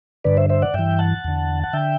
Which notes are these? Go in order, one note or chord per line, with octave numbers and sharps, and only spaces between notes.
G2 D3 B4 D5
C5 E5
C5 E5
D5 F#5
G2 E3 E5 G5
F#5 A5
E2 D3
F#5
D3 E5 G5